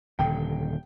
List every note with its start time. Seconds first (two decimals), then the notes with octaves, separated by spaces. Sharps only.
0.19 D#1 D3 G5